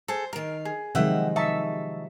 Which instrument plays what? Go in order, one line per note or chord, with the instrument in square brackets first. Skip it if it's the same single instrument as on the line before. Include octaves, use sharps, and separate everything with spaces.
[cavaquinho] G#4 A4 [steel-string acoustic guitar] C5
[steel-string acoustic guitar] D#3 F5 [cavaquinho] A#4
[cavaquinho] G#4
[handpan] C3 D#3 G#3 [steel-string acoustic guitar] F3 F#3 [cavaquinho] E5 F#5 G5
[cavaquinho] D#4 A5 C#6 [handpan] E5